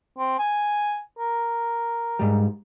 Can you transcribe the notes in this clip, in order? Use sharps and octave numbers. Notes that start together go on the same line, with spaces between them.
C4
G#5
A#4
G#2 G3